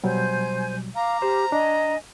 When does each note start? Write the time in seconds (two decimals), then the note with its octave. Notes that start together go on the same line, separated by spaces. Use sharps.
0.04 B2 F#3 G3 C5 G#5 G6
0.95 F5 A#5 D6 F6
1.22 G4 C5
1.52 D4 D#5 G#5